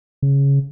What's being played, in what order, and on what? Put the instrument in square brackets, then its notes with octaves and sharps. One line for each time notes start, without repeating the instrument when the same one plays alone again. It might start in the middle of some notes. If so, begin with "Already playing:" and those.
[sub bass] C#3